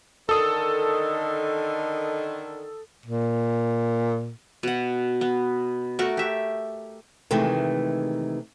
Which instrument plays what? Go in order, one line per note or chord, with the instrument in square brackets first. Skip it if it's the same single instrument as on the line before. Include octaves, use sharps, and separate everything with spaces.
[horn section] D3 D#3 [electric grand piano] A4 D#6
[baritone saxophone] A#2
[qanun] B2 F#5
B3
A3 F#4 A#4
G4 E5
[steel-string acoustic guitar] C3 D#3 E3 G#3 A3